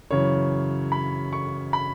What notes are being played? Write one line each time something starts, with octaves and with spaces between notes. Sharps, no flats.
F#2 C#3 E3 C#5
B5
C#6
B5